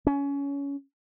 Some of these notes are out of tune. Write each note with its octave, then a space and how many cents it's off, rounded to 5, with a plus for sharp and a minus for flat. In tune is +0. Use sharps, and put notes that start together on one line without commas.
C#4 +20